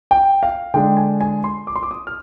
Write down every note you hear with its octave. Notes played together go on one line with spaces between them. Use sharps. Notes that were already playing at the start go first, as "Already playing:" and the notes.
G5
F5
D3 G#3 D4 G5
G#5
G#5
C6
D6
C6
D6
D#6
F6